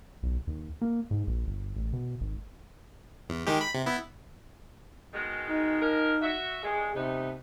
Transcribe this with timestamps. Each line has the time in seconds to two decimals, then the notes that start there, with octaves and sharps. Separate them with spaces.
0.23 B1
0.47 D#2
0.82 A#3
1.11 G#2
1.27 A#1
1.47 G1
1.76 A1
1.93 B2
2.21 G#1
3.29 E2
3.47 D#3 G#3 G4
3.61 B5
3.74 C3
3.86 B3 E4
5.14 B2 D#3 G#3
5.49 D#4
5.81 F3 G#3 A#4
6.22 F#4 E5
6.64 G2 G#3 G#4
6.95 C3 A3 B3 D#4